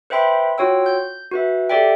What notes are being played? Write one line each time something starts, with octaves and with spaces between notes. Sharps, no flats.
B4 C5 E5 G5 B5 C6
F4 F#4 C#5 G5 E6
G6
F#4 B4 E5
G4 A4 D5 E5 G5